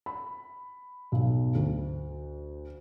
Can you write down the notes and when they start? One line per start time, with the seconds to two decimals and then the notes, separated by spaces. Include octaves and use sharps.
0.06 B5
1.12 B1
1.55 D2